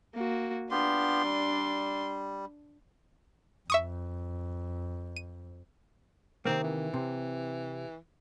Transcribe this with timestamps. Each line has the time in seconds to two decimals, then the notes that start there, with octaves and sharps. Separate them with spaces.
0.15 A#3 F#4
0.71 B3 D4 F4 G4 C6
1.24 G3
3.70 F2 E5 C#6 D#6
5.16 D#7
6.45 C3 D#3 A#3 C4
6.63 E3
6.94 C3